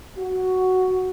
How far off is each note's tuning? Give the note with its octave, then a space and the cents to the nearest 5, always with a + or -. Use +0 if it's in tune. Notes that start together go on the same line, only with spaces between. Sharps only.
F#4 +5